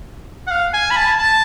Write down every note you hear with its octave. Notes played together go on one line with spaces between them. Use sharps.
F#5
F5
G#5
B5
A5
A5